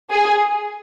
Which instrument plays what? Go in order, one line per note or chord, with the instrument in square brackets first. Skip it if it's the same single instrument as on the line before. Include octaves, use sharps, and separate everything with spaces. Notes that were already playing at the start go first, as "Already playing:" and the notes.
[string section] G#4